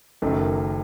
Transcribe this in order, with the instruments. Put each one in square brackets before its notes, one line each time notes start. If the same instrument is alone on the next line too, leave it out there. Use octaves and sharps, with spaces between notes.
[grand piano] F#1 F#2 D#3 F#3 A3